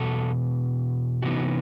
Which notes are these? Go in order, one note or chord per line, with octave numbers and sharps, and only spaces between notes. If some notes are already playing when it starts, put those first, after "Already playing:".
Already playing: E2 B2 A4
C3 E3 B3 D#4 F#4